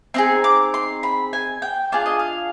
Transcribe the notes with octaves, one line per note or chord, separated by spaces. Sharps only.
C4 D#4 G#4 C6
D6
C6
B5
G#5
G5
D4 F4 G#4 F5
D#5
F5